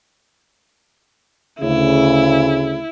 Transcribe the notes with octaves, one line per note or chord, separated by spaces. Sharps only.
D2 C#3 E4